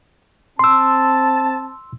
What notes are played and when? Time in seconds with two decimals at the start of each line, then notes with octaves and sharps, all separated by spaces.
0.59 C4 A5 C6 E6